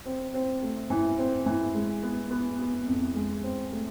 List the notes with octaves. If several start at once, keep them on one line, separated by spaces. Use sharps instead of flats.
C4
C4
A3
E3
C4
E3
G#3
B3
B3
B3
F2
G#3
C4
A3